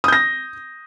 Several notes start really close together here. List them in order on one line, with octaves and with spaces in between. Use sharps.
D#6 G6 A#6